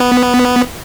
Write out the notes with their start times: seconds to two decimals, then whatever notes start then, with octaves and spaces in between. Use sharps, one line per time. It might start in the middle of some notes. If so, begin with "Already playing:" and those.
Already playing: B3